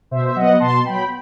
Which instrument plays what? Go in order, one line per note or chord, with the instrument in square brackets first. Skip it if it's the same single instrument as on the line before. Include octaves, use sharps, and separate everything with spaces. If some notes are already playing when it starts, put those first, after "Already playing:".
[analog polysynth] B2 C5 E5
E5
F#3 B3 D#5 F#5
B2 A5 C6
F#3 B3 G5 B5